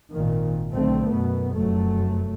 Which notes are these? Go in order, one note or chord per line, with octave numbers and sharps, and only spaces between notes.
G#1 A#2 D#3
B1 D3 A3 C4
F#2 B2 B3
F1 F#2 F#3 A3